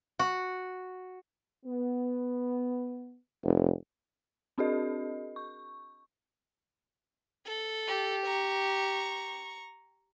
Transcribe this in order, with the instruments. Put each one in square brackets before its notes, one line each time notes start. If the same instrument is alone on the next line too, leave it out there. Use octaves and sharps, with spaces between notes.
[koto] F#4
[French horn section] B3
[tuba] F1
[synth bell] C4 D4 F#4 G#4 A#4 D#5
C#6
[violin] A4
[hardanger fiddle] G4
[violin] A#5 C#6